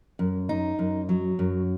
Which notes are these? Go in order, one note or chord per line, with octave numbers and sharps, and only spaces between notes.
F#2
D#4
F#2
F#3
F#2